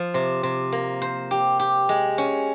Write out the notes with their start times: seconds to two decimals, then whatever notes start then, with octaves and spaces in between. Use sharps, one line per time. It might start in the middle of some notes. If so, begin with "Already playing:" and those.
Already playing: F3
0.14 C3
0.43 C3
0.72 A#3
1.02 C5
1.31 G4
1.59 G4
1.89 G#3
2.18 C#4